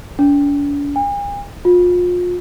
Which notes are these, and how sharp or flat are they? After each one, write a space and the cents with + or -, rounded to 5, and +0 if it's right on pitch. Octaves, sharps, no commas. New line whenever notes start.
D4 -45
G#5 -45
F4 +35